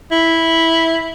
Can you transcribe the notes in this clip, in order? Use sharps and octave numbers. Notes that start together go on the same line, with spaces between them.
E4